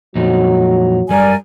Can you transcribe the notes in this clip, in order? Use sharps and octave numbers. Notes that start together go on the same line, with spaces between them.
F2 A#2 F#3 D#4
F#2 G3 A#4 D5 G#5